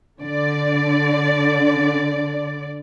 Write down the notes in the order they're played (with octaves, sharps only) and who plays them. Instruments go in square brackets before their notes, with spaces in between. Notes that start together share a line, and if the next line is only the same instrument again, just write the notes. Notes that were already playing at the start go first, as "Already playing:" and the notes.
[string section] D3 D5